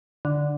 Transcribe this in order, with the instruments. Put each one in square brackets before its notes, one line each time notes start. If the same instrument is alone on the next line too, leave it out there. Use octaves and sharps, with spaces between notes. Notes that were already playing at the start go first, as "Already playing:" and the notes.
[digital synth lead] D3